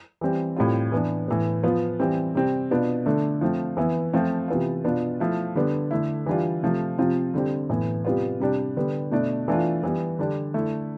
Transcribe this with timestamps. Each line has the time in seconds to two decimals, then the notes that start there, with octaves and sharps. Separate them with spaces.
0.21 E3 G3 C4
0.56 A2 G3 C4 F4
0.92 E3 B3 D4
1.28 A2 E3 B3
1.63 F3 B3 F4
1.99 E3 G3 C4
2.35 C3 G3 C4
2.71 B2 B3 D4 F4
3.06 D3 A3 D4
3.41 F3 A3 C4
3.77 E3 B3 E4
4.13 F3 A3 C4 F4
4.48 C3 E3 B3 F4
4.85 B2 B3 D4 F4
5.20 F3 A3 E4
5.55 D3 G3 B3 D4
5.91 D3 A3 E4
6.26 E3 G3 D4 F4
6.63 C3 F3 A3
6.98 C3 F3 C4 F4
7.34 D3 G3 C4
7.70 A2 E3 B3
8.05 C3 G3 B3 F4
8.40 C3 G3 D4
8.77 D3 G3 B3
9.11 B2 A3 D4
9.48 E3 A3 D4 F4
9.84 E3 G3 B3
10.19 D3 G3 D4
10.54 D3 A3 E4